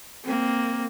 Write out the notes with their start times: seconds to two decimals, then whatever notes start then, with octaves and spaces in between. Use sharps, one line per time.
0.24 A#3 C4